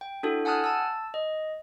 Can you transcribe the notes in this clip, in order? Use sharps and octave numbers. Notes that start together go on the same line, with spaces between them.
G5
D4 E4 F#4 A4
F#5 G#5 A5 D#6 F6 F#6
A5 E6
D#5